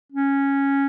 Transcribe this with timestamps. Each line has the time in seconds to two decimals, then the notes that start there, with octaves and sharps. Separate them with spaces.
0.12 C#4